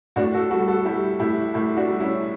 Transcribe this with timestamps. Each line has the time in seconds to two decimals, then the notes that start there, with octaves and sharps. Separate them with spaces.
0.16 A2 D4 F#4
0.34 F#4 A4
0.50 G3 F#4 A4
0.68 F#4 A4
0.85 G3 E4 G4
1.20 A2 E4 G4
1.54 A2 E4 G4
1.77 D4 F#4
1.88 G3
2.00 C#4 E4